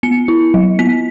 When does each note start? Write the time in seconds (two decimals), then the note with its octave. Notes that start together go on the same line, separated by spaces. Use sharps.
0.03 B3 C#7
0.28 E4
0.54 F#3
0.79 B3 B6